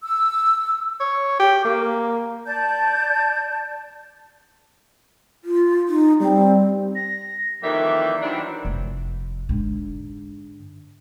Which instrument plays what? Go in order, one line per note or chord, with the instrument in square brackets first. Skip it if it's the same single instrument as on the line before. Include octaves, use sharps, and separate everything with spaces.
[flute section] E6
[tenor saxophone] C#5
G4
A#3
[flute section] D5 A5 G6
[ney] F4
D#4
[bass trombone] G3 [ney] C4
[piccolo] A#6
[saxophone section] F2 D#3 E3 G3 A#3 E5
D#3 E3 F#3 G3 C4 D4
[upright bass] F1
G#2 D3